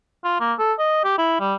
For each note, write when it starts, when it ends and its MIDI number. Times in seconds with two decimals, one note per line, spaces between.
0.24 0.37 65
0.40 0.53 58
0.59 0.73 69
0.79 1.02 75
1.04 1.15 67
1.18 1.37 64
1.40 1.54 55